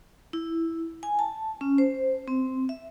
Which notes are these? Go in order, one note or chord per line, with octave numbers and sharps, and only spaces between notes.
E4
G#5
A5
C#4
C5
C4
E5